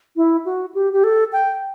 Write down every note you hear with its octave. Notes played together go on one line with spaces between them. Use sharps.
E4
F#4
G4
G4
A4
G5